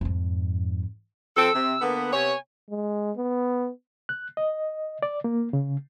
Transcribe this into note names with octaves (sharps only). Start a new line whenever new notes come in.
F2 G#2
F2 C4 A4 E6
C3
D3 A#3 B3
C3 B3 C#5 G#5
G#3
B3
F#6
D#5
D5
A#3
C#3